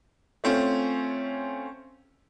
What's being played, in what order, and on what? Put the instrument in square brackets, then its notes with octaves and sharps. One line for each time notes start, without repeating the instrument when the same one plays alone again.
[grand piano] A3 C4 C#4 F4